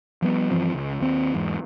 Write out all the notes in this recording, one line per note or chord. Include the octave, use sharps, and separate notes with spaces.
F3 G3 B3
G2 E3 F3 C4
C#2
D#2 C4
E2 G#2